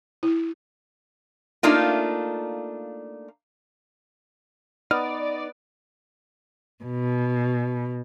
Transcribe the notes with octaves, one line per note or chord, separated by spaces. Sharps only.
E4
A3 A#3 D4 D#4 F4
B3 D#4 D5 F6
B2